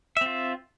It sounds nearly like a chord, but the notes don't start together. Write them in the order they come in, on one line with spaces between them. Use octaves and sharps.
E5 C4 F4